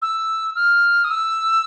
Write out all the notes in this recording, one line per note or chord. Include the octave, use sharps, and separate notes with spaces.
E6
F6
D#6
E6